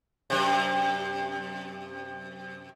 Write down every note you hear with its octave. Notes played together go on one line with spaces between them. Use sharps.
F#2 C3